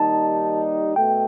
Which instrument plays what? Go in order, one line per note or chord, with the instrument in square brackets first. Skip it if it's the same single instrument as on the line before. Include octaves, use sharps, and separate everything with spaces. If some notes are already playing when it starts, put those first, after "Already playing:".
Already playing: [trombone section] D#2 D#3 G3 D#4 [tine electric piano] A5
[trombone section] B2 A3 [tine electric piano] G5